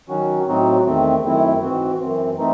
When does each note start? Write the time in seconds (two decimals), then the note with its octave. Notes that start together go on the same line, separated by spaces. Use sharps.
0.08 D#3 F#3 C#4 F#4
0.46 A2 F#3 C4 D#4 F#4
0.85 E2 D#3 A3 C4
1.24 F#2 D#3 A3 C4 E4
1.61 G#2 E3 C4 F#4
2.00 F#2 E3 C4
2.38 E3 A3 C4 D#4